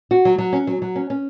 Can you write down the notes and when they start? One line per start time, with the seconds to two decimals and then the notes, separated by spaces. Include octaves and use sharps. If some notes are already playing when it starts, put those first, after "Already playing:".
0.11 F#4
0.25 F#3
0.38 F#3
0.53 C#4
0.67 F#3
0.82 F#3
0.96 C#4
1.10 C#4